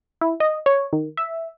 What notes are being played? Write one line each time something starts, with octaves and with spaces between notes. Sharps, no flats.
E4
D#5
C#5
D#3
E5